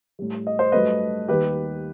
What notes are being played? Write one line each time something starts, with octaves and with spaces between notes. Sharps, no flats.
A2 G3
D#5
C5
G2 F#3 A3 B4 D#5
D#2 D#3 G3 G4 B4